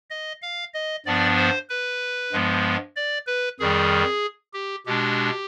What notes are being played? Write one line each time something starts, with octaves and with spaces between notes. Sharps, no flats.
D#5
F5
D#5
G2 F3 B3 D4 D5
C5
B4
G2 F3 G#3 B3
D5
B4
F2 D#3 G3 G#4
G4
B2 G#3 D4 G4